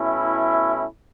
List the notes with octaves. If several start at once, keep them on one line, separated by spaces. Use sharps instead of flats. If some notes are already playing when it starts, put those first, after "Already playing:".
Already playing: B2 A3 C#4 E4